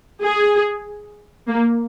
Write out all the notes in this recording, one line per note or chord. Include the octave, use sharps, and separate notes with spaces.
G#4
A#3